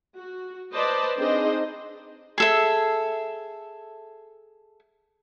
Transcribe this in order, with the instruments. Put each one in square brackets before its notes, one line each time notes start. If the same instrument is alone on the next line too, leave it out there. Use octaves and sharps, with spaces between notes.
[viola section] F#4
B4 C5 D5 D#5 A5
C4 D4 D#4 G#4 C5 D#5
[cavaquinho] G#4 A4 E5